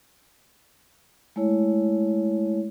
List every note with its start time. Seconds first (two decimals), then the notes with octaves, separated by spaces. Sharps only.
1.36 G#3 A3 E4 C#5